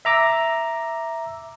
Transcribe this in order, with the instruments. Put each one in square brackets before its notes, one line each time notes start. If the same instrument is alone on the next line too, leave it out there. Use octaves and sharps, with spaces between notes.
[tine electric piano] E5 A#5 D6 E6